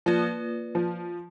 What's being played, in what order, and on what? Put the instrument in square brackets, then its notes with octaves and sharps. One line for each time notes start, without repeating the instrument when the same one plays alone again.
[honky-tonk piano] F3 [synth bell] A#3 F4 B4 D5
[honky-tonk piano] F3